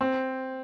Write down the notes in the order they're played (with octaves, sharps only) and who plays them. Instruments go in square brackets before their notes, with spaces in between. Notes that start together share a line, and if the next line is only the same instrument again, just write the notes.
[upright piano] C4